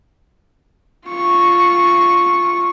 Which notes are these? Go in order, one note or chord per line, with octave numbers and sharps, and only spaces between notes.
F4 C#6